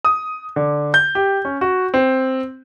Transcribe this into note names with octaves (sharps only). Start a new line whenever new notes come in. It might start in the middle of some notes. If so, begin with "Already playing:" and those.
D#6
D3
G6
G4
C#4
F#4
C4